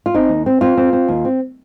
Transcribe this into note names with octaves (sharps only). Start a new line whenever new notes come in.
F4
C4 D#4
D#2
C4
C4 F4
C4
C4
D#2
C4